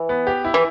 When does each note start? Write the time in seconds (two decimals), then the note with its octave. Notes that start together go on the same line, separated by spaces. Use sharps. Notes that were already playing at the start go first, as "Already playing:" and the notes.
Already playing: E3
0.09 B3
0.27 G4
0.45 E4
0.54 E3